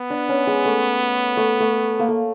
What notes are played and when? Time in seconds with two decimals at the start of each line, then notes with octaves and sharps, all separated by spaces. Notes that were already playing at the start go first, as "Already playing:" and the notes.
Already playing: B3
0.10 D4
0.29 C#4
0.47 G#3
0.65 A3
1.37 A3
1.60 A3
1.99 A#3
2.08 A3